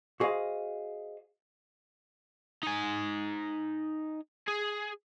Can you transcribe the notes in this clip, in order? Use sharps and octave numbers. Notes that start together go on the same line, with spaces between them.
F#4 G#4 C5 D#5 F5
D#4 G#5
G#4